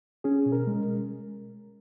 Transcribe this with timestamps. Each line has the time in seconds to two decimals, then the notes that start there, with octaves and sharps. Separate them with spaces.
0.24 C#4 G#4
0.46 B2
0.52 A#4
0.67 G#3